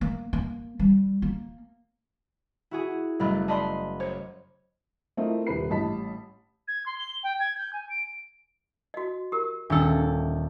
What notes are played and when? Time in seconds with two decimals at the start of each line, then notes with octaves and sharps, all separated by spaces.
0.01 A#3
0.33 A#3
0.79 G3
1.22 A#3
2.71 E4 F#4 G#4
3.20 F#1 G3 A3 D#5 B5 F#6
3.48 D5 D#5 A5 B5 C6
4.00 C5 C#5
5.17 A3 C4 E4 F4 A#4 D#5
5.47 D#1 C3 G4 B4 B5 C7
5.70 A1 G3 D#5 A5 B5 B6
6.68 G#6
6.86 C6
6.98 G7
7.23 G5
7.40 G#6
7.58 G6
7.73 G#5
7.89 D7
8.94 F#4 D#5
9.32 G4 A#4
9.70 D#1 D4 A4 B5 E6